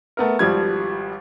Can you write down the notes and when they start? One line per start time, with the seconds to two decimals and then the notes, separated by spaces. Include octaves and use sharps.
0.17 A3 B3 A#4
0.39 G#1 F3 G3 G#6